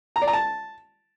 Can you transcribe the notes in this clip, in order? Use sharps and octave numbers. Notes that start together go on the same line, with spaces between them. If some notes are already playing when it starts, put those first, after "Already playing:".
A#5
D5
A#5
A5